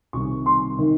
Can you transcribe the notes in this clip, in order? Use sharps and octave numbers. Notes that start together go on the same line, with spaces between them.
C2 C3 D#3 C#6
C6
D#3